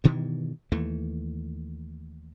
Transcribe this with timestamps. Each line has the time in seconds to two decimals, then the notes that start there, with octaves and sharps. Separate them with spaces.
0.04 G2 B2 D#3 E3
0.72 D#2 E3 A3